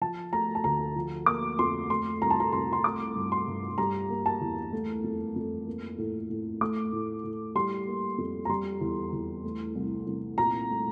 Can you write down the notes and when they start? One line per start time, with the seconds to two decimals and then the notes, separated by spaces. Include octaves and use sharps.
0.01 F3 A5
0.33 A3 A#5
0.55 A5
0.64 D2 A#5
0.96 F3
1.26 A#3 D6
1.59 F2 C6
1.90 A3 C6
2.22 C2 A#5
2.31 A5
2.40 A#5
2.52 C2 C6
2.73 C6
2.84 A3 D6
3.16 G2
3.32 C6
3.47 G2
3.78 G3 A#5
4.09 A#3
4.26 A5
4.41 E2
4.72 A3
5.04 F2
5.36 F2
5.66 A#3
5.98 A2
6.30 A2
6.61 A3 D6
6.92 A2
7.24 A2
7.55 G3 C6
7.87 A#3
8.18 F2
8.45 A#5
8.49 G3 C6
8.81 E2
9.13 E2
9.44 A3
9.75 C2
10.07 C2
10.38 A#2 A#5
10.70 A3